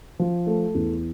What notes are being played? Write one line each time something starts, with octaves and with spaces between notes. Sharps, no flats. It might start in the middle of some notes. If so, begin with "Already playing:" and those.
F3
A3
E2